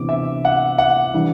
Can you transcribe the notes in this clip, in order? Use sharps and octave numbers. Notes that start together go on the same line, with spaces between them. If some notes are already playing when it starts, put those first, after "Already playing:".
Already playing: C3 E3 B3 D4 D6
E5
F#5
F#5
E3 G3 D4